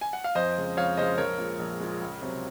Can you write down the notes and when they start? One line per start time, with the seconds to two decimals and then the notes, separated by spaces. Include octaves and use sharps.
0.01 G#5
0.13 F#5
0.24 F5
0.35 F2 C5 D#5
0.57 C#3 G#3
0.77 F2 C#5 F5
0.97 C#3 G#3 C5 D#5
1.18 A#1 A#4 C#5
1.38 A#2 G#3
1.59 A#1
1.80 A#2 G#3
2.01 C#2
2.22 C3 F#3